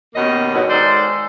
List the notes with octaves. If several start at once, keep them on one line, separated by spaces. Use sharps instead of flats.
D#2 B2 D#3 A#3 C#4 D#5
G#2 B2 F#3
D#3 G#3 A4 C5 D5